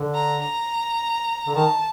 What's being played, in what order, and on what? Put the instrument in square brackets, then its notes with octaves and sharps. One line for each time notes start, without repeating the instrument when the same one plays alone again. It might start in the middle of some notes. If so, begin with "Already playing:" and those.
Already playing: [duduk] D3
[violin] A#5
A#5
[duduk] D3
[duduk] D#3 [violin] A5